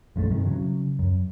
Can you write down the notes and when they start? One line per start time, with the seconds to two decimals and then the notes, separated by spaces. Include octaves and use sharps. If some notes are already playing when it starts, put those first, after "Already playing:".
0.16 A#1 F#2 D3 A3
0.31 G2 C3 D#3
0.47 C#3 F#3
0.99 F#2